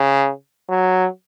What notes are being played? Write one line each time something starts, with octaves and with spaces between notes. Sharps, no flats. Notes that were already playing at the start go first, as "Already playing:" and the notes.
Already playing: C#3
F#3